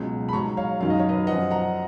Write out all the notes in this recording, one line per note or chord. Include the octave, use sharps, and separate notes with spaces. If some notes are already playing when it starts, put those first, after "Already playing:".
Already playing: C#2 B2 F#3
B5
G#2 F#3 A#5 C#6
C#5 F5
F#2 D#3 F#3 F5
D#5
C#5
B4 D#5
F#2 F3 D#5 F#5
F#5 A#5